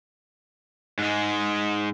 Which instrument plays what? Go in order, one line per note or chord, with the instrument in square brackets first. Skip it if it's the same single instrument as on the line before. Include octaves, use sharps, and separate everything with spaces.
[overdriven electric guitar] G#2 G#3